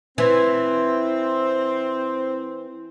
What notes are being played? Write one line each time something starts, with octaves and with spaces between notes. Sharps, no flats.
E3 C4